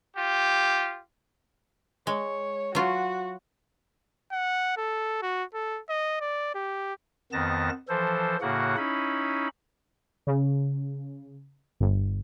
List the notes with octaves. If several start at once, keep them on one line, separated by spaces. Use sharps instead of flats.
F4 G4
G#3 C#5
F#3 F4 F#4
F#5
A4
F#4
A4
D#5
D5
G4
F2 D#3 B3 A5 A#6
E3 F3 A4 C5
A2 C#3 A#3 F#4 F#5
C#4 D#4 E4 B5
C#3
G1